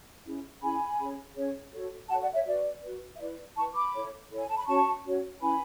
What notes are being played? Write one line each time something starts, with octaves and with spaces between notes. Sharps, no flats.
C#4 E4 G#4
C#4 E4 G#4 G#5 B5
C#4 G#4 C#5
C#4 G#4 C#5
F#4 A4 C#5
F#4 A4 C#5 F#5 A5
D5 F#5
C#5 E5
F#4 B4 D5
F#4 B4
E5
E4 B4 D5
E4 B4 A5 C#6
B5 D6
E4 A4 C#5
E4 A4 C#5
G#5
A5
B5
C#4 F#4 C#5 A5 C#6
C#4 F#4 C#5
C#4 E4 B4 G#5 B5